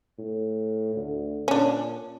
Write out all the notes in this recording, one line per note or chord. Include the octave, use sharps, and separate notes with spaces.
A2
D2
A#2 C#4 D4